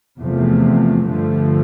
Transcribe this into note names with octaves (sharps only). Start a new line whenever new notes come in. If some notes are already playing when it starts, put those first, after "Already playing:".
E2 C3 F3 A3
G2 D3 F3 A3